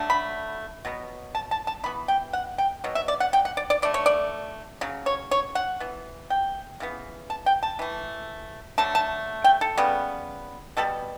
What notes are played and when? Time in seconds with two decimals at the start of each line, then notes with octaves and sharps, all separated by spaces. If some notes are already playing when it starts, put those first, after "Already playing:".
Already playing: D3 F#3 A3
0.10 B5
0.85 B2 F#3 B3
1.35 A5
1.51 A5
1.67 A5
1.84 E3 B3 B5
2.08 G5
2.33 F#5
2.58 G5
2.84 B2 F#3
2.95 E5
3.08 D5
3.20 F#5
3.33 G5
3.45 F#5
3.57 D5
3.70 D5
3.82 D3 A3 D5
3.94 C#5
4.06 D5
4.81 C#3 F#3
5.06 C#5
5.31 C#5
5.55 F#5
5.80 E3 B3
6.30 G5
6.80 C#3 E3 B3
7.30 A5
7.46 G5
7.63 A5
7.79 E3 A3
8.78 D3 F#3 A3 A5
8.95 A5
9.44 G5
9.61 A4
9.77 C#3 G3 B3
10.77 B2 G3 B3 A4